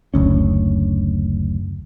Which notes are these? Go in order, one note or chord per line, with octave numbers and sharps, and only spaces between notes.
F#1 D2 C#4